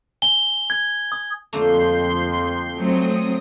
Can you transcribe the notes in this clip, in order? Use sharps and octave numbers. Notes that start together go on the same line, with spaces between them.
G#5 G7
G#6
D#6
F2 D3 A3 A#3 C6 G6
F#3 A3 C4 D#6